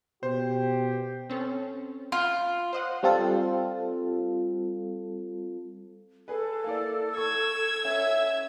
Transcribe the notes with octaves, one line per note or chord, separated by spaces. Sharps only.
B2 G4 C5
C4 C#4 A4
F4
C5 D#5 F#5
G3 C4 F4 A4
G#4 A4 B4
A#3 E4 D5
C#6 E6 G#6
C#4 E5